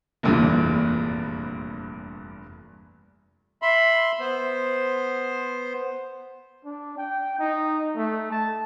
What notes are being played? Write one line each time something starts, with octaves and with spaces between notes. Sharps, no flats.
F1 A#1 E2 G2 A#2
E5 B5 C6
B3 C5
D4
G5
D#4
A3
A5